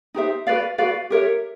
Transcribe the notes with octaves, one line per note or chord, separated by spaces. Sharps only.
D#4 G4 C5 E5
F#4 B4 D5 F5
F#4 B4 D5 F5
G4 A#4 C#5 E5